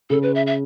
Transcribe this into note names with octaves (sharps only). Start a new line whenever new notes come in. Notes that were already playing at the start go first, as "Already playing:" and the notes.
C#3 A4
B4
E5
E5